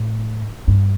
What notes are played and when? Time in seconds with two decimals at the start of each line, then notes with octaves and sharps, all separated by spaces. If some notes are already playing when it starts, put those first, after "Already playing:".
Already playing: A2
0.68 G2